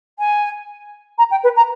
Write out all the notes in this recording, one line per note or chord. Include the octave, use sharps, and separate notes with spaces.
G#5
A#5
G5
B4
A#5